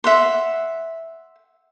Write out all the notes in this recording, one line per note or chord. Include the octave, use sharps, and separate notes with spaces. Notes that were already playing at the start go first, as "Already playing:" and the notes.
E5 F#5 C6